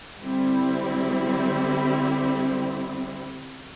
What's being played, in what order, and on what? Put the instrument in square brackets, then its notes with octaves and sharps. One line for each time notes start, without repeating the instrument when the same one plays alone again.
[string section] D3 G3 C4 E4